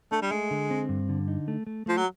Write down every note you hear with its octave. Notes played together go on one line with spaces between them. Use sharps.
A3 D4
G3
G#3 A3
D3
C4
G2
D3
D#4
A3
A3
F3 A3
F#3